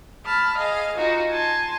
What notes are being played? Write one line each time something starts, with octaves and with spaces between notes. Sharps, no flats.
A5 B5 F6
G#4 D#5 F5
D#4 F4 F#4
G#5 A5 C6